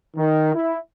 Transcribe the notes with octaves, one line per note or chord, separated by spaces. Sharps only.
D#3
E4